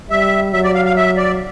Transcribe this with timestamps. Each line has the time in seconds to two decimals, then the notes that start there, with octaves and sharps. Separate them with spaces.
0.10 G3 E5
0.53 F#3 E5
0.64 D5
0.75 F5
0.85 F5
0.96 E5
1.17 D5